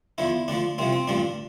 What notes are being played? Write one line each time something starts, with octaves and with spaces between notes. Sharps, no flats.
E2 D3 F3 E4
D2 D3 F3 D4
C2 C3 F3 C4
C4
A1 G2 D3 F3 D4